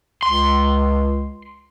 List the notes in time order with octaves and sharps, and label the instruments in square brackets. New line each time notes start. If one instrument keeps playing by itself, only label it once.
[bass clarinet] C#2 [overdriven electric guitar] C6